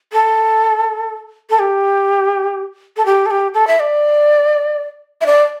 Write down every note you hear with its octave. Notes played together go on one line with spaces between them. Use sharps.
A4
A4
G4
A4
G4
A4
G4
A4
E5
D5
E5
D5